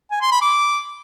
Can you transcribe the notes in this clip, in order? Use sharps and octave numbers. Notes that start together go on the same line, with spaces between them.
G#5
C6
B5
D6